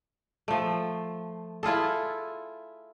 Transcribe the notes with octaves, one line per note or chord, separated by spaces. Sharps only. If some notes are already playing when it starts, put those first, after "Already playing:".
F3 A3
E4 F4 G#4 A4